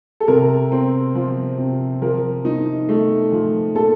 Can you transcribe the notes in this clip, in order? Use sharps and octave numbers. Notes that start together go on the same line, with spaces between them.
A4
C3 A#4
C4
F3
C3
F3 A#4
D#4
A3
F3
A#2 A4